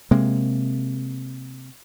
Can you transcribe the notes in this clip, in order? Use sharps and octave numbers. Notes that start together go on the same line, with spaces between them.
C3 G#3 A#3